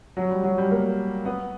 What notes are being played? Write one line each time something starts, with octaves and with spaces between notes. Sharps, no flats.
F#3
G3
F#3
G3
A#3
B3